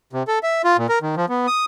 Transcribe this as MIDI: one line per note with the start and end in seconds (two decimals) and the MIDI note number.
0.13 0.23 48
0.28 0.39 69
0.43 0.62 76
0.64 0.77 65
0.78 0.87 46
0.89 0.99 70
1.02 1.15 51
1.17 1.26 53
1.29 1.47 59
1.47 1.65 87